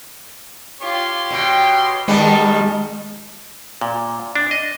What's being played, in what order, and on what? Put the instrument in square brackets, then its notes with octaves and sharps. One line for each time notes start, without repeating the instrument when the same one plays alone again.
[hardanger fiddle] F4 [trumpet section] G4 C#5 C6
[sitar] B2 [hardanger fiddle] G5
[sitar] D#3 G3 B3 [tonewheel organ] G#3 [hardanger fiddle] A5
[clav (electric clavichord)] A#2
D4
D#5